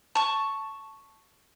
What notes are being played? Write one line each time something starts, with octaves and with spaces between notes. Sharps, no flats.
A5 C#6